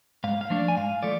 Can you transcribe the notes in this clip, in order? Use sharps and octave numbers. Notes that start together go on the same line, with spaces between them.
G#2 F5
F5
F3 A3 D4
D5
G#5
G#2 F5
F3 A3 D5